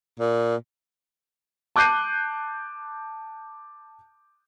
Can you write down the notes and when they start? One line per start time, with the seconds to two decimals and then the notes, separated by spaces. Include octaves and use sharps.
0.20 A#2
1.76 A5 D6 F#6 G6 C7 D#7